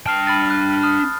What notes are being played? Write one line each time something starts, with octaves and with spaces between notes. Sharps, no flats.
D4 G5 A5 F6 C7
B5 F6 A6
F#6
D#6 F6